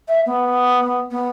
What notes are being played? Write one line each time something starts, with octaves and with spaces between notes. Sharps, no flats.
E5
B3
B3